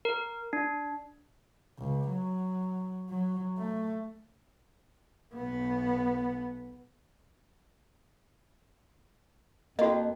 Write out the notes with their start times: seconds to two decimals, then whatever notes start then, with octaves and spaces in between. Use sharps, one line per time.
0.05 A#4
0.53 D4
1.78 C#2
2.09 F#3
3.10 F#3
3.58 A3
5.35 B1 B3
9.79 F2 A#3 F#4 D#5